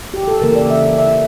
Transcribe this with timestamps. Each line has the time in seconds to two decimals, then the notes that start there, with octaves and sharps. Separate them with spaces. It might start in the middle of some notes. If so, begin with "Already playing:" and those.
0.14 G4
0.28 A4
0.42 C#3 E3 A#3 A#4
0.56 D5
0.70 E5
0.98 E5